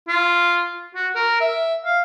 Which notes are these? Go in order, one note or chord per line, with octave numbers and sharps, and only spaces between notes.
F4
F#4
A#4
E5
F5